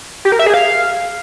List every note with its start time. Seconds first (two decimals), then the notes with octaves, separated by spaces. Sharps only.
0.25 G4
0.32 A#4
0.39 E5
0.47 G#4
0.54 F5